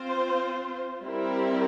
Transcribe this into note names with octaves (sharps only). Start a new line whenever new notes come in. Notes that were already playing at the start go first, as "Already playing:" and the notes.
Already playing: C4 F4 C5
G3 C4 E4 A#4